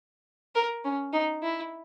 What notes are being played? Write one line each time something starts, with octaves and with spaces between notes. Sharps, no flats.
A#4
C#4
D#4
E4